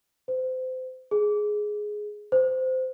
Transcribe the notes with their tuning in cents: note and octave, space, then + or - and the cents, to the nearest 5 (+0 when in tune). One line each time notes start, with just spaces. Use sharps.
C5 -30
G#4 +10
C5 -20